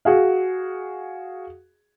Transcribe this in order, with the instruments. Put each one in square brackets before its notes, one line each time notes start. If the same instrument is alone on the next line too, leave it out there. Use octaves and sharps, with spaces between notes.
[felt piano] F#4 G#4 F5